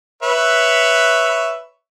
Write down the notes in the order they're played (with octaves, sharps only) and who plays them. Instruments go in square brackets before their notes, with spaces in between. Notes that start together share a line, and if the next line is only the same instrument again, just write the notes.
[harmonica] B4 C#5 E5